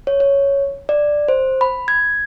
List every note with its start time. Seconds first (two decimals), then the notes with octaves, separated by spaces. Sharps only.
0.07 C#5
0.20 C#5
0.89 D5
1.28 C5
1.61 B5
1.88 G#6